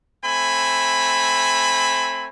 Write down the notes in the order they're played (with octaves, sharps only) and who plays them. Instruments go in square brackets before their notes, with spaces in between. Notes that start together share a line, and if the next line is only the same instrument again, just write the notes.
[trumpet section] A3 C4 G#5 B5